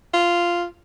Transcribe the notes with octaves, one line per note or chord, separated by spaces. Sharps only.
F4